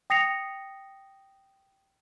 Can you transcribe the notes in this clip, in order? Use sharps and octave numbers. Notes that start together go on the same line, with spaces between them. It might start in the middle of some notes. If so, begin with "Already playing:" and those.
G5 D#6 A#6 C7 C#7 F7